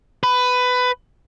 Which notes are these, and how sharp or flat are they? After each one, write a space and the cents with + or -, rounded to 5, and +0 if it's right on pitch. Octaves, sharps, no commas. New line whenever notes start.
B4 +15